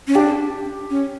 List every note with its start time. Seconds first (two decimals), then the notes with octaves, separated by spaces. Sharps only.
0.08 C#4
0.15 D4 G4
0.90 C#4